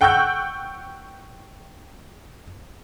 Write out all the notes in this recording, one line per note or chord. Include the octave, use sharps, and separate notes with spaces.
F#5 G5 C#6 E6 F#6 G6